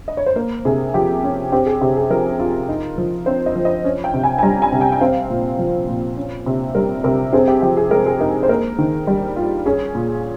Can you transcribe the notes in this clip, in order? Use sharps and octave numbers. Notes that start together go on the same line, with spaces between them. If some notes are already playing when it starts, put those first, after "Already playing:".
D#5
C#5
C5
A#3 A#4
C3 G#4
F3 G4
C#4
C4 G4
G#4
C3 G4
G#4
F3 A#4
F4
D#4
F3
C4 C5
D#5
F3
D#5
C#4
G5
C3
G#5
G#5
G3 A#5
G#5
C3
G5
G5
C4 F5
A#2
F3
A#2
C#4
C3
G3 A#4
C3 A#4
C4 G#4
G4
F3 G4
G#4
G#3 A#4
G#4
D#4 A#4
C5
A#3 A#4
D#3
G3
F4
C#4 G#4
A#2